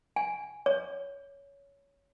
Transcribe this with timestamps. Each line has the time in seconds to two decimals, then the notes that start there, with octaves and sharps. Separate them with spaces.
0.16 G#5
0.66 C#5